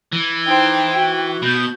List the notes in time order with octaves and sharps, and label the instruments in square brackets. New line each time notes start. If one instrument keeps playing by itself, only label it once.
[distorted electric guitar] E3
[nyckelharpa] D#4 C5 [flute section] G5
[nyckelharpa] F#4
[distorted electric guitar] B2 [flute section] G6